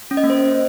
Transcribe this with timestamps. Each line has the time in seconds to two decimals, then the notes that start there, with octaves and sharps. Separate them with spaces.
0.11 C#4
0.17 D#5
0.23 A#3
0.30 C5